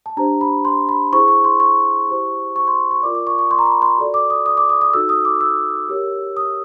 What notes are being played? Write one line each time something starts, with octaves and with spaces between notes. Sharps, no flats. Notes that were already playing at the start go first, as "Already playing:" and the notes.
A5
D4 G4 C5 A#5
B5
C6
B5
E4 G#4 C5 C#6
C#6
C6
C#6
E4 G4 C5
C#6
C6
C#6
F4 A#4 D5 D6
D6
C#6
C#6
C6
A#5
B5
C6
F#4 A4 D5
D6
D#6
D#6
D6
D#6
D#6
D#4 F#4 A4 E6
D#6
D6
E6
G4 A#4 C#5
D#6